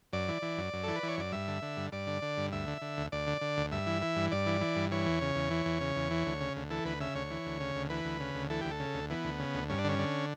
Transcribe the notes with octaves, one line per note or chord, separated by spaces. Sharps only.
F#2 D5
E3
E3
F#2
F#2
E3 A4
B4
E3
C#5
F#2 D5
G2 E5
D3
D3
G2
G2 D5
D3
D3
G2
D2 E5
D3
D3
D2
D2 D5
D3
D3
D2
G2 E5
E3
E3
G2
G2 D5
E3
E3
G2
E3 C#5
E2
C#3
E2
E3
E2
C#3
E2
E3
D2
C#3
D2
E3 A4
D2 B4
C#3 E5
D2 C#5
E3
D2
C#3
D2
E3 B4
D2
C#3
D2
E3 A4
D2 G4
A4
C#3
D2
E3 B3
D2
C#3
D2
G2 C#4
D4
D3 C#4
D3